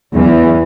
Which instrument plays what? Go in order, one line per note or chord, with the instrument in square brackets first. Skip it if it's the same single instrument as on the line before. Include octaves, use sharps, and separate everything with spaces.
[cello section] E2 E3